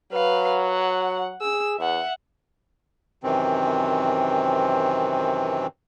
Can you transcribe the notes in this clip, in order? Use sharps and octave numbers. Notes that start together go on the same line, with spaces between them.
F#3 B4 F5
F#5
G#4 E6
E2 E5 F#5
F#2 C3 D#3 E3 C4